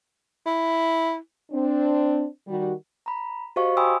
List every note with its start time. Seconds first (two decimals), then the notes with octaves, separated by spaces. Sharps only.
0.46 E4
1.52 C4 D4
2.47 D#3 G3 F#4
3.06 A#5 B5
3.56 F#4 G4 C5 D#5 F5 C#6
3.77 G5 G#5 B5 C6 D#6 E6